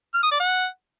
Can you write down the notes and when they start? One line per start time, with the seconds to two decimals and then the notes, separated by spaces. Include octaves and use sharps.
0.14 F6
0.22 D#6
0.31 D5
0.40 F#5